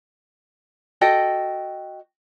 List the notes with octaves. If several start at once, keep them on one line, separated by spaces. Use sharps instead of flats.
F#4 A4 D#5 G5